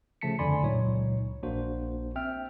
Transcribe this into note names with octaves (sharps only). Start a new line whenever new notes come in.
C#3 F3 A3 A5 B6 C#7
F2 D3 D5 G#5 B5 C6
C#2 A#2 F#3 D#4 C#5
A#1 A#3 D4 F#4 C5
C4 E5 G5 F6